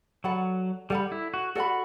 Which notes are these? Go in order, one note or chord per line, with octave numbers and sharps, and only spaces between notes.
F#3 A4 D5 F#5 B5
G3 A4 D5 F#5 B5
E4
F#4
F#4 A4 D5 F#5 B5